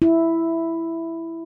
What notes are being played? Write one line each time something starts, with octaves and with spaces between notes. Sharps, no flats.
E4